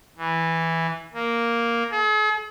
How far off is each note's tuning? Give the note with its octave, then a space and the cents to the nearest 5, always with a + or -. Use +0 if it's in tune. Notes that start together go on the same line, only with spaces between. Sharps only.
E3 -5
A#3 +0
G#4 +45